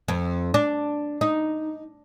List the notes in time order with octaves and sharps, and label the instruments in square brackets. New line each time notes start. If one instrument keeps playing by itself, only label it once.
[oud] F2
D4
D#4